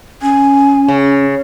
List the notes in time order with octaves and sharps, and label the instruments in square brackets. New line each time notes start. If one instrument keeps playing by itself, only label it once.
[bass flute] C#4 [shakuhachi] G#5
[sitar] C#3